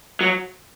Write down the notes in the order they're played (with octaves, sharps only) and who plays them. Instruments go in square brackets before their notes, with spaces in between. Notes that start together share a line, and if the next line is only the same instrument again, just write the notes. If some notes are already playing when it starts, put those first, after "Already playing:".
[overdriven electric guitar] F#3